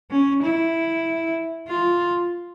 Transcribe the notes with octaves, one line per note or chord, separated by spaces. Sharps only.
C#4
E4
F4